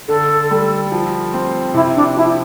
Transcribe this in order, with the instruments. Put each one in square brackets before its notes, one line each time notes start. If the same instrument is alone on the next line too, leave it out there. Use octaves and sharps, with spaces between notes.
[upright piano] D3 [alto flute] A4
[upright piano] G3
F3
C4
[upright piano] C3 [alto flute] E4
[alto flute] D4
[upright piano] F3 [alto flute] E4